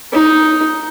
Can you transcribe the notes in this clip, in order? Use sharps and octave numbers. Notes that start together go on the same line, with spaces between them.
D#4